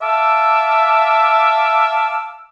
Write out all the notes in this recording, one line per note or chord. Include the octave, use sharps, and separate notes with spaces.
E5 F5 A5 D6 E6